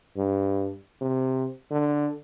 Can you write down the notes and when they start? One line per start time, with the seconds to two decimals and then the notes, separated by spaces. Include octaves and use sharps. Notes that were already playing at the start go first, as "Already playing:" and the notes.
0.17 G2
1.01 C3
1.71 D3